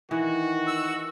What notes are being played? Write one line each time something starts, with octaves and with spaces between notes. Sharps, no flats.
D#3 E3 F#4
E6